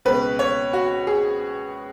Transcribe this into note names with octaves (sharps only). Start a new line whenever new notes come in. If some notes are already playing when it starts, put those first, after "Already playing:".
C#2 B2 B4
C#5
F#4
G#4